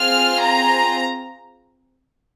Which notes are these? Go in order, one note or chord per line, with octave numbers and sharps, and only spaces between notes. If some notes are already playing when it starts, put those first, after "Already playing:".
Already playing: C4 F4 G#4 F6
A#5